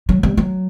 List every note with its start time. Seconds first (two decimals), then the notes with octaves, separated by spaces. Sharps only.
0.09 F#3
0.23 G3
0.37 F#3